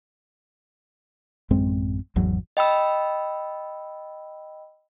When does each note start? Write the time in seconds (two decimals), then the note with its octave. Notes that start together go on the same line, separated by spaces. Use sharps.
1.50 A1 F#2 G#3 C4
2.16 G#1 E2 F#3
2.57 D#5 G5 B5 E6